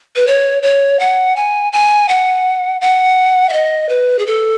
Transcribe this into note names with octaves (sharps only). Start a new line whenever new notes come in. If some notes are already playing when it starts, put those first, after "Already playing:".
B4
C#5
C#5
F#5
G#5
G#5
F#5
F#5
E5
D#5
B4
G#4
A4